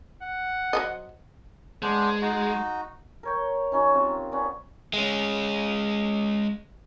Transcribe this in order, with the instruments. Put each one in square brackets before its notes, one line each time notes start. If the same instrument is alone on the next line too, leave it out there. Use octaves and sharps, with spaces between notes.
[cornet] F#5
[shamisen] F#3 C5 D#5
[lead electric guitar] G#3 [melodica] B3 D4 C5
[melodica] D#4 F#4
[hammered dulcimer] A#4 C#5 G5
F#3 C#4 D#4
C3 F4
B3 C#4 D5
[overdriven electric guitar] G#3 C#4